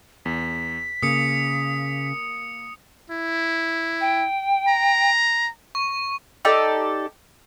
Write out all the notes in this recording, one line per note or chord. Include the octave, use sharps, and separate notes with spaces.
E2 B6
C#3 A#3 D#6 C#7
E4
G5
A#5
C#6
D#4 G4 A4 D5